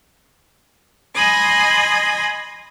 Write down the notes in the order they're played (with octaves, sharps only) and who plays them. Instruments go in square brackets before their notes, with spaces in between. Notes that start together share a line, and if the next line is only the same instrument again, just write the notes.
[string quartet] D#5 G#5 B5 C6 D#6